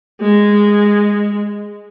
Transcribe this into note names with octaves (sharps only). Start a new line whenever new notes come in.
G#3